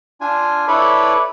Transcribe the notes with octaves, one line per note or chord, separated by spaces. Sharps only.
D4 F4 G#5
E4 A4 B4 C#5 D5 B5